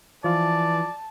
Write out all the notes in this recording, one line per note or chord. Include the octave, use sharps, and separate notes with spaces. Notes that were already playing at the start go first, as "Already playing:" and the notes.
E3 F3 F4 D5 A5